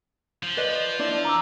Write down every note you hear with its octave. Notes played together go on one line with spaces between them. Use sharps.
F3
B4 D5 D#5
D4 E4 D5
A#5 D6 E6